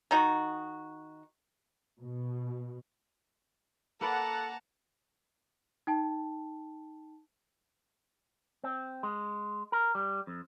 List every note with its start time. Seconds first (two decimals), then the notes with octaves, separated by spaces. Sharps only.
0.11 D#3 D#4 F#4
2.00 B2
4.01 A#3 A4 B4 D5 F#5 A5 A#5
5.87 D#4 G5 A5
8.64 C4
9.03 G#3
9.72 A#4
9.95 G3
10.27 F2